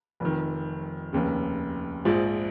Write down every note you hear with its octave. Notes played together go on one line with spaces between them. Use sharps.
F1 F2 D#3
F1 D#2 C#3
A#1 G#2 F3